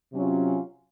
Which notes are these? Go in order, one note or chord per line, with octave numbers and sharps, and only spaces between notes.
C3 F#3 C#4 F4